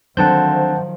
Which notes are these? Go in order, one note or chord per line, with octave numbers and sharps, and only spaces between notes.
D3 D#3 F3 F#3 C4 F#5 A5 G6